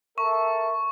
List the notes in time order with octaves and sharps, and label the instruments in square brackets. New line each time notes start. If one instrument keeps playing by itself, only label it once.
[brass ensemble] A4 A#4 E5 [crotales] C#6